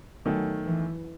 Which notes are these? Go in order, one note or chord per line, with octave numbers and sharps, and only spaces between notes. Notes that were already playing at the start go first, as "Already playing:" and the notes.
E2 D#3 F#3 A3
E3